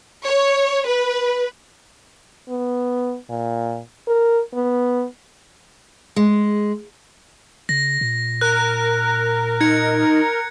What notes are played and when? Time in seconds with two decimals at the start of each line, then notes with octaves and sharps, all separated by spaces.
0.23 C#5
0.87 B4
2.49 B3
3.30 A#2
4.08 A#4
4.54 B3
6.16 G#3
7.69 C#3 A#6
8.01 A#2
8.41 A#4 F#6
9.61 D#4 G#6 C#7